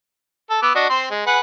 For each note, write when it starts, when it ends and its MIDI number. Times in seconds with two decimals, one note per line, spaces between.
0.50 0.61 69
0.63 0.72 59
0.63 0.72 86
0.63 0.72 88
0.75 0.90 62
0.75 0.90 66
0.75 0.90 75
0.90 1.07 60
0.90 1.07 72
0.90 1.07 84
1.10 1.23 56
1.27 1.40 68
1.27 1.40 71
1.27 1.40 78